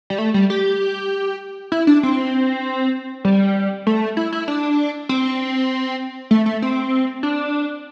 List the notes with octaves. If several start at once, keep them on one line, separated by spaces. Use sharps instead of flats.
G3
A3
G3
G4
E4
D4
C4
G3
A3
E4
E4
D4
C4
A3
A3
C4
D4